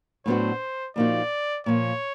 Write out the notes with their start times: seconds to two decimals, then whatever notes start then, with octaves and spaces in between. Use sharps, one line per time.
0.26 A2 F#3 B3 D4 F#4 C5
0.96 A#2 F3 A#3 D#4 F#4 D5
1.66 A#2 F3 A#3 C#5